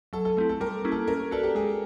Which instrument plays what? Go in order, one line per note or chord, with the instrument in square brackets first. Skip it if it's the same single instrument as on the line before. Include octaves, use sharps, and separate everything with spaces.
[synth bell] F#3 [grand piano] A4
[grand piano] A4
[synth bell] A3 C4 E4 [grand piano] A4
[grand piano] A4
[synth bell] G3 [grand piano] A#4
[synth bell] A#3 C#4 E4 G4
[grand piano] A4
[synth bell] C#4 [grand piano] A#4
[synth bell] F#4 B4 D5 [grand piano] A4
[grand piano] G4
[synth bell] G#3 [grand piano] G#4